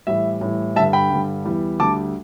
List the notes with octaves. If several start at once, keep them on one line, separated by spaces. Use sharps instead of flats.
A2 E3 G3 E5
A2 E3 G3
G2 D3 G3 E5 A5
G5 B5
G2 D3 G3
E2 E3 G3
D2 D3 G3 A5 D6